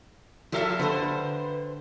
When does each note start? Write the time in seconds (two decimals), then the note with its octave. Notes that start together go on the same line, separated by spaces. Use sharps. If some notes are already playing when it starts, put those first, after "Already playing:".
0.52 F3 G4 A4 A#4 E5 F5
0.79 D3 B4 C5